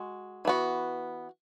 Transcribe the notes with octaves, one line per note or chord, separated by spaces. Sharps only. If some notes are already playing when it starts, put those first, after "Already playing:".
Already playing: G#3 F#4
E3 B3 F#4